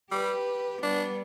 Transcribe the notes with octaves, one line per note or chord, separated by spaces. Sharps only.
G3 G4 B4
G3 B3 D4